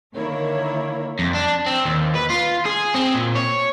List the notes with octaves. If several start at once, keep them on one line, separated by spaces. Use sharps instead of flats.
D3 D#3 A#3 E4 A#4 C#5
F2
D4
C4
D#2
B4
F4
G#4
C4
A#2
C#5